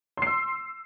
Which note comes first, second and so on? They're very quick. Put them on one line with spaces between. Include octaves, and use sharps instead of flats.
C6 C7 E6